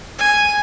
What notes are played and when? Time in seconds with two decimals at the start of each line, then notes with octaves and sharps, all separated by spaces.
0.18 G#5